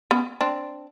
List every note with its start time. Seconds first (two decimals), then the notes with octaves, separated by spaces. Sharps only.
0.11 B3 C#4
0.41 C4 D4